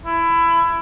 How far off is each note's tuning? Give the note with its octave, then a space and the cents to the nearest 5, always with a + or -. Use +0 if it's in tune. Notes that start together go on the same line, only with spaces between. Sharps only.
E4 +20